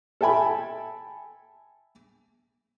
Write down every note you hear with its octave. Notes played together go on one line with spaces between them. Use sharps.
A4 E5 G5 G#5 B5